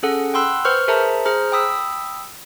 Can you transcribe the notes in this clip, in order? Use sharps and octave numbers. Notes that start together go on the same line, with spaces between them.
C#4 G#4 A4 F#5
F#5 G5 B5 C6 E6 F#6
B4 C5 C#6 F6 G6
G#4 A#4 C5 E5 A5 A#5
G#4 C5 A#5 F6
G5 B5 D#6 E6 B6